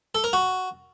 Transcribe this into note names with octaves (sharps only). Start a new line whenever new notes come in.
A4
A#4
F#4